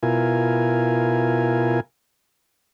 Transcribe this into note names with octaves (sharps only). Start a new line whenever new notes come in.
B2 E4 F4 A#4 G#5